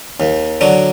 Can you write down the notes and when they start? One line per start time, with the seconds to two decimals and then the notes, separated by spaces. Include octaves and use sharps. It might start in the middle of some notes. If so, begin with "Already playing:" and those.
0.20 D#2
0.61 D3 F#3